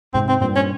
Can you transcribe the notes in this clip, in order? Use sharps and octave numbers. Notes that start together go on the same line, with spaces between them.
G#2 C3 C4
C4
G2 A#2 C4
C#4